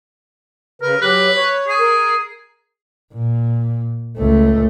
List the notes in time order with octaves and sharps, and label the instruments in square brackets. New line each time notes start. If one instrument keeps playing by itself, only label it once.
[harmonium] C#3 B4 [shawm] A#4
[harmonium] F#3 G4 [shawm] B4
[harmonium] C#5
[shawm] G#4
[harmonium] A#4
[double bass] A#2
C#2 A3